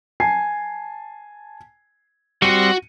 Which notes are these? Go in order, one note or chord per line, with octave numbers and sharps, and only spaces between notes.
G#5 A5 C7
G3 C4 F#4 F#5 C#7 D#7